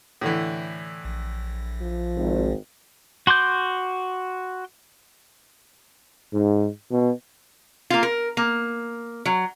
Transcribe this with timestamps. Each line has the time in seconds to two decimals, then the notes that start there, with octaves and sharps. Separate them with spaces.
0.21 A2 D3 E3
1.05 A#1
1.81 F3
2.17 G#1
3.27 F#4 C6 D6 G6
6.33 G#2
6.90 B2
7.90 A#3 F4
8.03 A#4
8.37 A#3
9.25 F#3